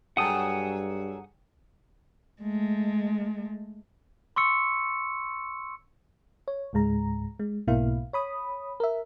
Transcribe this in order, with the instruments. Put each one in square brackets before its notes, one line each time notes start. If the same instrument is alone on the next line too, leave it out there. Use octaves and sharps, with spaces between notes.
[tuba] G2 [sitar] F#3 G#4 A4 [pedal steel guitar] F#5 D#6 [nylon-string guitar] G5
[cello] G#3 A3
[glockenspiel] C6 C#6 E6 C#7
[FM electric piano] C#5
C#2 G#2 G#3 A#5
G#3
B1 G#2 B2 A#3 E4 F5
C#5 B5 D#6
A#4 E5